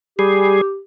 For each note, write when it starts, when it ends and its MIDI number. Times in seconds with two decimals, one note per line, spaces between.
0.19 0.61 55
0.19 0.80 67
0.19 0.61 68